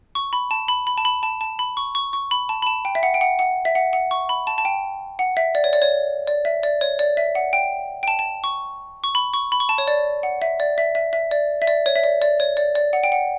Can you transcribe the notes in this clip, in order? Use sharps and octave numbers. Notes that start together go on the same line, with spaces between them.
C#6
B5
A5
B5
B5
A5
B5
A5
A5
B5
C#6
C#6
C#6
B5
A5
B5
A5
G5
E5
F#5
G5
F#5
F#5
E5
F#5
F#5
C#6
B5
A5
A5
G5
F#5
E5
D5
C#5
D5
C#5
D5
E5
D5
C#5
D5
E5
F#5
G5
G5
A5
A5
C#6
C#6
B5
C#6
B5
C#6
A5
C#5
D5
F#5
E5
D5
E5
E5
E5
D5
E5
D5
C#5
E5
D5
D5
C#5
D5
D5
F#5
G5
F#5